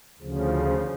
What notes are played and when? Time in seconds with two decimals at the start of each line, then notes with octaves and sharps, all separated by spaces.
0.19 D2 C#3 F3